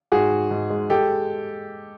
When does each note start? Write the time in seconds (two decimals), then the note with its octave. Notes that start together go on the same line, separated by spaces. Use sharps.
0.12 G#2 F#4 G#4
0.31 G#2
0.51 G#2
0.70 G#3
0.90 G#3 G4 A4